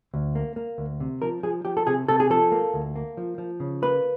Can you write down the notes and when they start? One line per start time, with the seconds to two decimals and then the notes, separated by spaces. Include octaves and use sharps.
0.14 D2
0.35 A#3
0.56 A#3
0.78 D2
1.00 C3
1.22 F3 A#4
1.43 F3 G#4
1.65 F3 G4
1.77 A4
1.87 C3 G#4
2.08 C3 A4
2.20 G#4
2.30 F3 A4
2.52 A#3
2.74 D2
2.96 A#3
3.17 F3
3.38 F3
3.60 C#3
3.82 A#3 B4